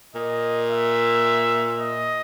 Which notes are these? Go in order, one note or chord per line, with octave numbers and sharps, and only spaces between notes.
A#2 D#5
E5
D#5